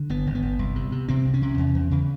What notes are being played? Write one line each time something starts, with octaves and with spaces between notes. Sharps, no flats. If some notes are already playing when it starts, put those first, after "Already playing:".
Already playing: D3
G1 B3
G1
B3
G1
C2
C3
C3
C3 C4
C2
C#4
C3
E2
E2
C#3